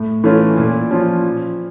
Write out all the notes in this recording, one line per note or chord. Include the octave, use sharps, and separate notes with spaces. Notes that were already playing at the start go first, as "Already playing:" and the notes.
Already playing: A2
E3 A3 C#4 F4
A#2
F3 C#4 F4
F3